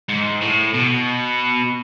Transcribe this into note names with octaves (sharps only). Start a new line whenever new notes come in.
G#2
A2
B2